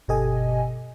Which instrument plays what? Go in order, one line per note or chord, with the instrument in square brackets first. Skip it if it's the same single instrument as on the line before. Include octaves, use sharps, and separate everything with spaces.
[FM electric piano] G1 B2 G4 A4 D#5 G#5